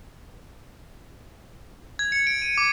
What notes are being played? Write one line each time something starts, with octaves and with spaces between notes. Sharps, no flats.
G#6
C#7
D7
D#7
D6